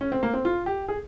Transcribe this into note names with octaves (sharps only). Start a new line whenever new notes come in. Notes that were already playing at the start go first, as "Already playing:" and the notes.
C#4
C4
A#3
C4
F4
G4
G#4